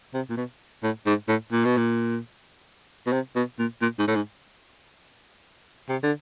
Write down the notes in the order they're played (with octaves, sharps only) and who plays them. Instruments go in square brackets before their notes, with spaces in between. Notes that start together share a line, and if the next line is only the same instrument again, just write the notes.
[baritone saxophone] C3
A#2
B2
A2
G#2
A2
A#2
B2
A#2
B2
C3
B2
A#2
A#2
G#2
A2
G#2
C3
D3